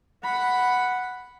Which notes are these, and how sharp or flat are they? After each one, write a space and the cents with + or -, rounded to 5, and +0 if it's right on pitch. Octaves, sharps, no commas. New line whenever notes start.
F#5 +0 B5 +0